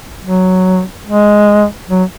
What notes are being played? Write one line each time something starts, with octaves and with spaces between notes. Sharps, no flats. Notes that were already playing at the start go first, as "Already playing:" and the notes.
F#3
G#3
F#3